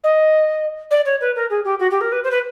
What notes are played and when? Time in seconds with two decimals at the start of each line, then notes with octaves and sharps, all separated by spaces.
0.03 D#5
0.91 D5
1.05 C#5
1.21 B4
1.35 A#4
1.50 G#4
1.64 G4
1.79 F#4
1.90 G4
2.01 A#4
2.12 B4
2.23 C5
2.31 B4